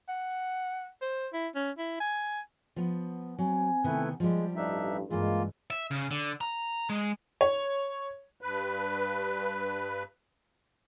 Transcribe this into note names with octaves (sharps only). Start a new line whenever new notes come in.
F#5
C5
E4
C#4
E4
G#5
F3 B3
F#3 C4 G#5
C3 D#3 A3 B3 E4 B4
F3 G3 G#3
A1 G2 D4 D#4 E5
G2 E3 G#3 A#3 F4
E5
C#3
D3
A#5
G#3
C#5
G2 B4